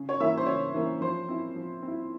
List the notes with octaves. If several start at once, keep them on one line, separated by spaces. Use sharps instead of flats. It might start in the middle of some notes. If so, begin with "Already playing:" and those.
Already playing: C#3
C#5
E3 A#3 C#4 E5
C5
C#3 C#5
E3 A#3 C#4
F3 C5
C4 E4
F3
C4
E4